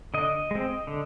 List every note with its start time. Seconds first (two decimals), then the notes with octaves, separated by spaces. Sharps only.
0.14 D3 D#5
0.51 G#3 C4
0.87 D3